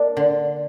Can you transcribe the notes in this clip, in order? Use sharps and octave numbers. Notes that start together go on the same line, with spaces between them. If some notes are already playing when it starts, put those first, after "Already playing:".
Already playing: A#3 D4
D3